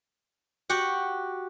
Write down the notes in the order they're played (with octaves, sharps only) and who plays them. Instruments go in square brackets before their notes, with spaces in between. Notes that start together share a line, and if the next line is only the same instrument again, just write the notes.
[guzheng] F#4 G4 F#5